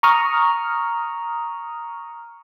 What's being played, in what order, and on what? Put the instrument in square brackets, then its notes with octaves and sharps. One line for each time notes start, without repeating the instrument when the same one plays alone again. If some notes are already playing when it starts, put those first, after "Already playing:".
[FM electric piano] A#5 C#6 D#6 F6